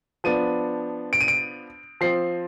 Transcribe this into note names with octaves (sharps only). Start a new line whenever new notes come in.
F3 B3 D4 D#7
D7
D#7
D7
F3 C4 C7